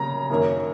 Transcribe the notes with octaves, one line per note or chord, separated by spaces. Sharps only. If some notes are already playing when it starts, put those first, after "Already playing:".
Already playing: C#3 F#3 A#3 A#5
F#2 D#3 A#3